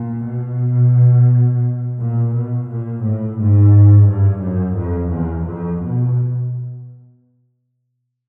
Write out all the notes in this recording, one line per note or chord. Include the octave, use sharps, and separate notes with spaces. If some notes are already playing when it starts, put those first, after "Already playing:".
Already playing: A#2
B2
A#2
B2
A#2
A2
G#2
G2
F#2
F2
E2
F2
B2